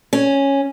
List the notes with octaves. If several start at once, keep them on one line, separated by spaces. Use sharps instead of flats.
C#4